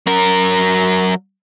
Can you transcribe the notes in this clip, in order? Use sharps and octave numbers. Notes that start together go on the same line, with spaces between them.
F#3 A#4